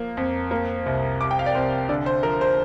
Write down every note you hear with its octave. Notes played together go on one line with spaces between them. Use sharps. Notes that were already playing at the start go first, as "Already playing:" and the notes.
Already playing: F3 A#3
F2
A#3
C2
C2 D6
G5
F5
D5
C2 C5
D3 D5
C5
F3 A#4
C5